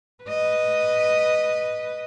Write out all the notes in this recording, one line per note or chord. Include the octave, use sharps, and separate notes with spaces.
B4 D#5